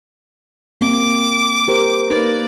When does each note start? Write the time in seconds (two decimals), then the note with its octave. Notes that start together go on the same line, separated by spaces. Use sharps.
0.81 A#3 C4 D6
1.68 G4 A#4 C5
2.10 A#3 D#4 B4 D5